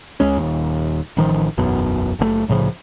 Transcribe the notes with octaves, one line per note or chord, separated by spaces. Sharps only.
C#2 G#3 C#4
D#1 D#2
A1 D#3 F3
E1 B1 F#2 B2
F#1 B2 A3
C2 A2 C#3 F3